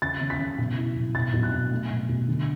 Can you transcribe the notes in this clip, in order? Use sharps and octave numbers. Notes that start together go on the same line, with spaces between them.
C#3 A6
C#3
B6
C#3
B2
E4
B2
B2 A6
B2
F#6
D4
A3
B2
B2
D3